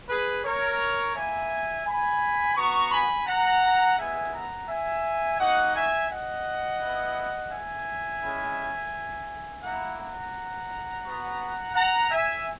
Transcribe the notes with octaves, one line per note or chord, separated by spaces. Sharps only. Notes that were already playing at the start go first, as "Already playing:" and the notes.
G#4 B4
A#4 C#5
A#3 E4 E5 G#5
G#5 B5
B3 F#4 A#5 C#6
G#5 B5
F#5 A#5
G#3 B3 E4 E5 G#5
F#5 A#5
E5 G#5
A#3 D#4 F#4 D#5 F#5
E5 G#5
D#5 F#5
B3 E4
E5 G#5
G#3 C#4 E4
A#3 E4 F#5 A#5
F#5 A#5
B3 F#4
F#5 A#5
E5 G#5